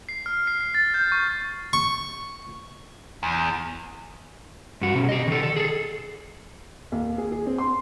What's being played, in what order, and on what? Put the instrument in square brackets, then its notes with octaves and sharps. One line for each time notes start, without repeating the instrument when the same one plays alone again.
[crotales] C7
F6
C7
C7
A6
G6
C#6
[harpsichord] C#6
[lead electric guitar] E2
[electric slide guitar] G2 F#4
B2 C#4
G4 D#5
D#3 A4
A4
G#4 A4
[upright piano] D#2
G#4
G#4
C4
C6